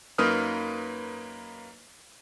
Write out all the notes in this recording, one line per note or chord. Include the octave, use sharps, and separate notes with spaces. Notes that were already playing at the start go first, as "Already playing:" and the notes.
F#2 A#3 D#4 B4 D#6 F6